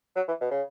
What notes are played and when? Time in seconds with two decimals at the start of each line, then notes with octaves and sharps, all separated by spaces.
0.16 F#3
0.28 E3
0.41 B2
0.51 C#3